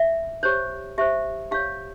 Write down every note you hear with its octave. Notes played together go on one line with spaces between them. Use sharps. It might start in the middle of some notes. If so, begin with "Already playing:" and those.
Already playing: E5
G4 C5 C#5
G4 C5 E5
G4 C#5 F5